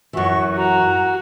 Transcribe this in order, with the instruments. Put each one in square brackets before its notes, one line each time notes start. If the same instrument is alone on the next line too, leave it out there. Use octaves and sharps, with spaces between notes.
[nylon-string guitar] F#2 E3 [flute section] F#4 C#6
[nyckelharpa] F#4 [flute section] A#5